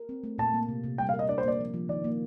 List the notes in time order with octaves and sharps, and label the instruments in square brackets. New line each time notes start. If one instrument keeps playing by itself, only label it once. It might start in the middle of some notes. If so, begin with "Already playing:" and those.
Already playing: [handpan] A#4
C4
A3
[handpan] A#2 [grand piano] A5
[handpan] A#3
C3
C3
[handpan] G3 [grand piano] G5
[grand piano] F5
[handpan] A#4
[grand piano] D#5
[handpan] D4 [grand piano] D5
[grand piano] C5
[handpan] A#3 [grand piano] D5
[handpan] F3
F3
[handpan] D#3 [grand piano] D5
[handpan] A#3